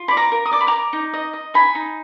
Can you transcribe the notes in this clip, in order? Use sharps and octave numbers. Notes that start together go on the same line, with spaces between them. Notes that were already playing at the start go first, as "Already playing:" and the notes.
Already playing: F4
D5 B5
A#5 D6
A#4
D#6
D5 D6
B5
A#4 A#5 D6
D#4
D#5
D#5
D#4 G#5 B5
D#4